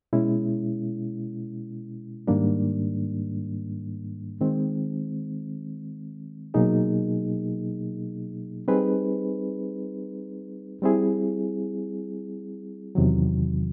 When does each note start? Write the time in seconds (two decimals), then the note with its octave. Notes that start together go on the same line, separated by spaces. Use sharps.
0.13 B2 G#3 C#4 E4
2.27 G#2 D#3 G3 A#3 D4
4.41 D#3 G#3 C4
6.54 B2 F#3 A#3 D#4 G#4
8.68 G3 C4 D#4 G#4 B4
10.82 G3 C4 E4 G#4
12.95 E2 C3 D#3 F#3